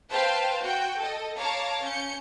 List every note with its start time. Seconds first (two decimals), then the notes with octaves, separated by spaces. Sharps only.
0.10 B4 C5 F5 G5 A5
0.61 F#4 G5
0.99 A4 D#5
1.38 C#5 F5 A5 A#5 D6
1.81 C#4 G6 C#7